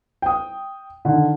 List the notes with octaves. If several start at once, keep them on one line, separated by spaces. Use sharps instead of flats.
G5 D#6
D3 D#3